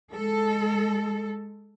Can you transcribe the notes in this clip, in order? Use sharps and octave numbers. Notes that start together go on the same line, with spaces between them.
G#3 A4